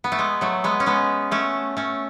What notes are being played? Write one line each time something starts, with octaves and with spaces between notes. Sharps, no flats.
B3
A3
G#3
F#3 A3
G#3 B3
C#4
G#3 B3
A3 C#4
A3 C#4